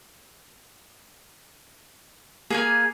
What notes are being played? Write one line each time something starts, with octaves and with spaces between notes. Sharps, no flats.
A#3 G#4 A#4 G#5